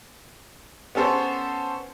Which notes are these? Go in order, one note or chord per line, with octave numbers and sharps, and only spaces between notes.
B3 C#4 A4 C5 C#5